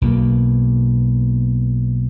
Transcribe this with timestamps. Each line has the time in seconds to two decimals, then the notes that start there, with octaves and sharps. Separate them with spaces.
0.01 B1 B2 A#3